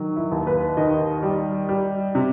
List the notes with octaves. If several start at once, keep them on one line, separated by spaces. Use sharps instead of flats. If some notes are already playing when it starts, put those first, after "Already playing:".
Already playing: D#3 F#3
E4
D#2
B4
D#3 D#5
G3
G3
C3